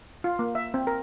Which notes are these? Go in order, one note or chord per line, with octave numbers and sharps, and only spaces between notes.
F4
A#3
E5
C4
A#4